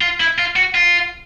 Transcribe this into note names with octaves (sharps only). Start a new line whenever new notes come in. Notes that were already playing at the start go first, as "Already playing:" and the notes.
F4
E4
F4
F#4
F4